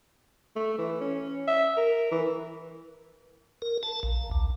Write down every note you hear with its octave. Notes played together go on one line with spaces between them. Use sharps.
A3
E3
C#4
E5
A#4
E3
A#4
A5
A#1
D2